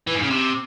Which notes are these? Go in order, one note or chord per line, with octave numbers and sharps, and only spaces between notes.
E3
G#2
C#3
C3